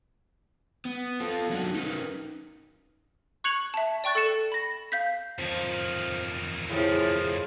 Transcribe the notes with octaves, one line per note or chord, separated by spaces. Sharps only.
B3
F4 A4
F#3 A#3 D4 D#4 F#4
C#4 D#4 G4 A#4 B4
C#6 F#6 G#6 C#7 F7 F#7
E5 A5
D5 G5 C#6 F#6 A6
A4 A6 C#7 E7
B5 A#6
F5 G6 B6
F2 D#3 F3
A2 F3 E4 G#4